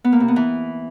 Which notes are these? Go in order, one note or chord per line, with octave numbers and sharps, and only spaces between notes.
B3
A#3
C3
B3
E3